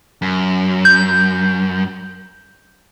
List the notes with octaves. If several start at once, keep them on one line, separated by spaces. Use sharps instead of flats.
F#2
G6